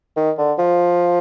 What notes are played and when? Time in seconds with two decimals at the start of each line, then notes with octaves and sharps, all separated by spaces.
0.17 D#3
0.38 D3
0.59 F3